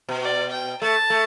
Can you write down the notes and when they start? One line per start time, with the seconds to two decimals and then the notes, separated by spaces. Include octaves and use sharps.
0.09 B2
0.22 D5
0.51 G5
0.82 A3 A5
1.10 A3